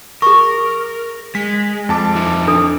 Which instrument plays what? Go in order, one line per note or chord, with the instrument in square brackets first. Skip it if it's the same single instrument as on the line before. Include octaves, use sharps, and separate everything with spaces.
[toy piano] G#4 C#6 [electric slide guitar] A#4
[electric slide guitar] G#3 [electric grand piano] B6
[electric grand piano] F2 A5 D6
[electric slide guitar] F3 D#4 E4
[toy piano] D4 A4